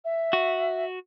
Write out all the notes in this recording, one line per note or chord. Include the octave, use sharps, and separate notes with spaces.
E5
F#4